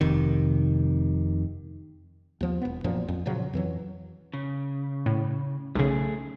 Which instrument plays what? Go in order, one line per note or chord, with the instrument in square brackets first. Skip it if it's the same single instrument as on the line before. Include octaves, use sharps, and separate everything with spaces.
[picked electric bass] F1 C3 D#3
[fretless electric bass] D#2 F3 B3
E1 B3
A1 F#2 A#2 F3
F2
A#2 C#3 F3 F#3
F2 E3 F#3
[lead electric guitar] C#3
[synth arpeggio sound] A2
[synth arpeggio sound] B1 C#3 [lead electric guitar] A3 G#4